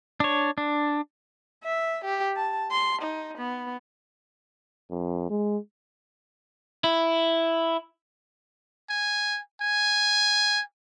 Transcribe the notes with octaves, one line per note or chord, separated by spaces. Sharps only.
D4 C#5
D4
E5
G4
A5
C6
D#4
B3
F2
G#3
E4
G#5
G#5